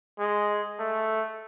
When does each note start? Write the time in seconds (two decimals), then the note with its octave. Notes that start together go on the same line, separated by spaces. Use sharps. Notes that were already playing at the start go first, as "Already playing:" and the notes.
0.19 G#3
0.79 A3